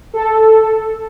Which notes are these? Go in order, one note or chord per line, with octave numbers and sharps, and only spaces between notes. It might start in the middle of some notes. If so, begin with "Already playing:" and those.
A4